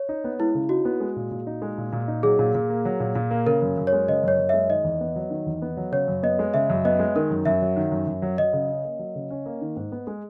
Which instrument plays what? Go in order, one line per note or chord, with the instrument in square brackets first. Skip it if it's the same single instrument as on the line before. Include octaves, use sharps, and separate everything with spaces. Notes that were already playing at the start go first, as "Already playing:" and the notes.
Already playing: [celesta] C#5
[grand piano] D#4
B3
[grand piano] G#3 [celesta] E4
[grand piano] C#3
[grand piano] D#4 [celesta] F#4
[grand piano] B3
G#3
A#2
A#2
D#4
G#3
A#2
A#2
D#4
[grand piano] F#3 [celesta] G#4
[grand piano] A#2
A#2
A#3
F#3
A#2
A#2
A#3
[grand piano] C#3 [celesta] A#4
[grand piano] F#2
F#2
[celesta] C#5
[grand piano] G#3
[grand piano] C#3 [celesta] D#5
[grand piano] F#2 [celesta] C#5
[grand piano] F#2
[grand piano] G#3 [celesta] E5
[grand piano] D#3 [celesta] D#5
[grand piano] E2
B3
F#3
D#3
E2
B3
F#3
[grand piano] C#3 [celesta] C#5
[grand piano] F#2
[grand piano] B3 [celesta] D#5
[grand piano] G#3
[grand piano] C#3 [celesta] E5
[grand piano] F#2
[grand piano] B3 [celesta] D#5
[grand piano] G#3
[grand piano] D#3 [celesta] A#4
[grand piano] F#2
[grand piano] F#2 [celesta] E5
[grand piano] F#3
D#3
F#2
F#2
F#3
[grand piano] F#3 [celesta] D#5
[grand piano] C#3
C#4
A#3
F#3
C#3
C#4
A#3
D#3
G#2
B3
G#3